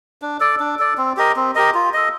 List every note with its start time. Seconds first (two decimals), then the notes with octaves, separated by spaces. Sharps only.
0.22 D4
0.40 A4 D5
0.60 D4
0.79 A4 D5
0.98 C4
1.17 G4 A#4 D#5
1.36 C4
1.55 G4 A#4 D#5
1.74 F4
1.94 A4 D#5